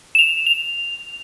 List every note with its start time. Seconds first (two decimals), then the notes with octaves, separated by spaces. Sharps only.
0.15 E7 F7
0.47 F7